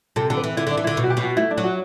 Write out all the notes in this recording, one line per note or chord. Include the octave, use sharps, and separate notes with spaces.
C3 A4
D3 A4
B4
E3
D3 E4
D3 D4
E3
D3 E4
B2
F#4
G4
B2
F#4
A3 E4
D4
F#3
F#4